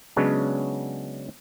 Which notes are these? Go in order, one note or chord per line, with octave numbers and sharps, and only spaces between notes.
C#3 F#3 G#3 B3 C#4 D4